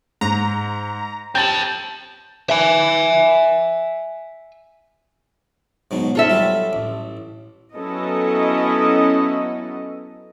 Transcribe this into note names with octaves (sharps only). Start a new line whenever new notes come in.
G#2 A#5
C4 A4 G6 A6 F#7
E5 G#5
G#2 B2 F#3
G#2 F4 A4 E5
F#3 G3
A1
F#3 B3 C#4 E4 A4 D#5